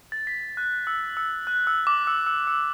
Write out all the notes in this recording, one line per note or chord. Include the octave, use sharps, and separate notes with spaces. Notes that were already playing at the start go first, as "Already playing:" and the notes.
A6
B6
F#6
E6
E6
F#6
E6
D6
E6
E6
E6